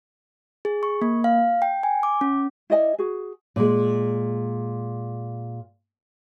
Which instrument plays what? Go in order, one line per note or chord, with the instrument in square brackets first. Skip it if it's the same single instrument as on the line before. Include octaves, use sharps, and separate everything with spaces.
[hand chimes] G#4
C#6
A#3
F5
G5
G#5
D6
C#4
[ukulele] E4 D5 D#5 G#5
F#4 G#4
[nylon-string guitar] A#2 G#3